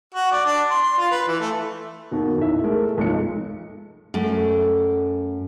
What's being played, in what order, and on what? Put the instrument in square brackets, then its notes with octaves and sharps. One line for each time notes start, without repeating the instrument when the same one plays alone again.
[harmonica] F#4
D5
D4
C6
C6
F4
B4
E3
A3
[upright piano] D#2 B2 D#3
B1 E4 E5
G#3 A3 G#4 A#4
F1 B1 F3 G#3 A4 C#7
[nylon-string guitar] F#2 A3